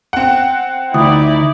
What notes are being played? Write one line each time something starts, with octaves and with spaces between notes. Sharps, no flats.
C4 F#5
D2 D#4 E4 D5 D#6